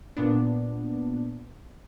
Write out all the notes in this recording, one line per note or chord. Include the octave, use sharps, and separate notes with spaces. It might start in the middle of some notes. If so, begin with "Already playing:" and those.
A#2 B3 D4